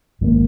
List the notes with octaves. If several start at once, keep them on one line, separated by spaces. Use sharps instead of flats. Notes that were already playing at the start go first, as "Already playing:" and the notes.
G#1 G#2 D#3 A#3